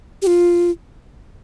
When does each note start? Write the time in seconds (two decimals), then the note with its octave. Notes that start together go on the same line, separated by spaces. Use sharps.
0.22 G4
0.27 F4